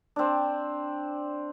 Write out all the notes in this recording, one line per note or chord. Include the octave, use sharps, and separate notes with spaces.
C4 D4